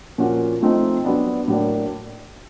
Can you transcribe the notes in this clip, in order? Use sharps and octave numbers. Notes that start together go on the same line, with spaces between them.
A#2 F3 A#3 C#4 F#4
F3 A3 C4 D#4
F#3 B3 D4
A2 F#3 A#3 D4